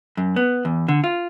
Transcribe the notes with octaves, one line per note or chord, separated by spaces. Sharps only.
F#2
B3
E2
D3
F4